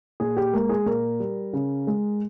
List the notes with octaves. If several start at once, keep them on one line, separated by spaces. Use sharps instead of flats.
A#2 G#4
G4
G#3 A#3
G#4
A#2 A#4
G3
C#3
G#3